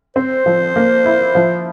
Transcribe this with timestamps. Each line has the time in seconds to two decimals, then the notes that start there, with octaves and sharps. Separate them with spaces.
0.16 C4 C5
0.46 F3
0.76 A#3
1.05 E4
1.35 F3